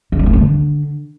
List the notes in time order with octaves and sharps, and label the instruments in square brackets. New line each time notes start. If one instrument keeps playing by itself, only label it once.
[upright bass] D3
F#3
A3
D3